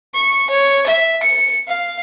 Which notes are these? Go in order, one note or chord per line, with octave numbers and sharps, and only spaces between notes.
C#6
C#5
E5
C#7
F5